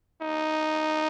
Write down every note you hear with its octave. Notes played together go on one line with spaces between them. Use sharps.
D#4